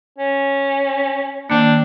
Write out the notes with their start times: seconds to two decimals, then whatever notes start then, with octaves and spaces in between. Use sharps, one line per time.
0.18 C#4
1.50 D#3 A#3 C4 D4